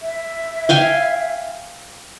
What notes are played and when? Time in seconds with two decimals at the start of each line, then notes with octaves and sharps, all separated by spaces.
0.02 E5
0.69 F5 G5 G#5